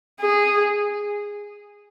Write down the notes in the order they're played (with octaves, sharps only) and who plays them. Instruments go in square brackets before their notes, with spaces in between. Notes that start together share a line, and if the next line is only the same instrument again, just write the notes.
[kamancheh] G#4